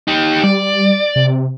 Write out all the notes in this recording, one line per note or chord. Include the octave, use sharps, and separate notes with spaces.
D#4 G4
G3 D5
C3